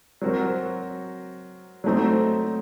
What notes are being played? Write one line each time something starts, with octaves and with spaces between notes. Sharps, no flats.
F#3 C4 F#4 A#4
F#3 A3 C4 D#4